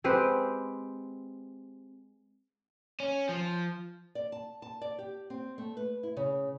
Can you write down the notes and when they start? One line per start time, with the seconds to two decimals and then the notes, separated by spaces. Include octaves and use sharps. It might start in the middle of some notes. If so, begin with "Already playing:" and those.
0.04 G#3 C4 G4 B4
3.00 C#4
3.29 F3
4.15 D5
4.32 A5
4.62 A5
4.82 D5
4.99 G4
5.30 C4
5.58 A3
5.77 B4
6.03 E4
6.17 C#3